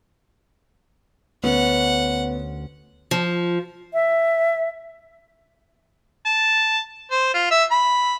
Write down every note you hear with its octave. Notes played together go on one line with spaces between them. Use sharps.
D2 B3 C#4 F#5
F3
E5
A5
C5
F4
E5
B5